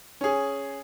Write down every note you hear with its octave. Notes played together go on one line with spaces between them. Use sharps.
C#4 G#4